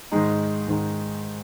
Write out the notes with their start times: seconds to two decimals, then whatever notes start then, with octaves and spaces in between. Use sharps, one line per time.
0.12 G#2 D#3 G#3 D#4
0.68 G#2 D#3 G#3 D#4